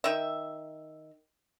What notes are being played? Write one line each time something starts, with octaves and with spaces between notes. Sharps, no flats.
D#3 E5